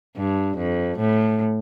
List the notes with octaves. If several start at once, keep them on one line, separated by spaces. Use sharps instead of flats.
G2
F2
A2